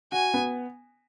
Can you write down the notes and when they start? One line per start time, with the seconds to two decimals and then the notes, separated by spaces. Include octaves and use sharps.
0.12 F#4 G#5
0.34 B3